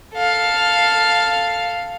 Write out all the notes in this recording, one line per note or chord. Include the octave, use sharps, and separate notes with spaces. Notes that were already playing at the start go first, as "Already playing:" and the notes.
A4 F5